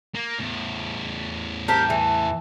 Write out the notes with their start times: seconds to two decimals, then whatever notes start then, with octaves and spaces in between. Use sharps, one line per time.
0.15 A#3
0.39 E2 A2
1.68 C4 G4 A#4 A5
1.90 E3